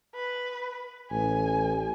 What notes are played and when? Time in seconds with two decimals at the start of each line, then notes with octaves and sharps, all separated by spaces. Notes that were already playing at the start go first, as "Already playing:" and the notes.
0.15 B4
1.11 A1 G#5